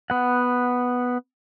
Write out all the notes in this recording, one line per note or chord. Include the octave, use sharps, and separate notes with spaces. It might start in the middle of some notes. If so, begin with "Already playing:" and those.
B3 F#5